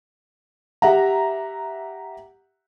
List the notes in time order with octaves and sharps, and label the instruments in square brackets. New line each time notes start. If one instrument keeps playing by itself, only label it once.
[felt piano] G4 E5 F#5 A#5